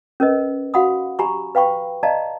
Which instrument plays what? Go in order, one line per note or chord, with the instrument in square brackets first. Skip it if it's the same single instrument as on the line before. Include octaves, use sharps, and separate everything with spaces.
[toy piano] C#4 A#4 B4 D#5
F#4 F5 F#5 B5 D#6
G4 G#5 A#5 B5 C#6
B4 F5 G5 B5 C#6
D5 D#5 F5 A5 A#5